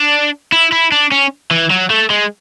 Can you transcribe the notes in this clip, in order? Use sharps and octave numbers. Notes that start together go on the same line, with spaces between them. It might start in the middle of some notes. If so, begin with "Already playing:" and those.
Already playing: D4
E4
E4
D4
C#4
E3
F#3
A3
G#3